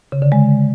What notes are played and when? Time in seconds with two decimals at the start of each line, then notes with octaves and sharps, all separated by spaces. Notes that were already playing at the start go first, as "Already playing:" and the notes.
0.12 C#3
0.22 D3
0.32 G#3